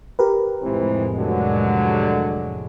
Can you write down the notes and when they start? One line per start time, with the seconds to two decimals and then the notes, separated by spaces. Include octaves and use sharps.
0.19 G4 A#4 B4
0.62 F1 A2 E3 F3 G#3 C4
1.16 D3 F#3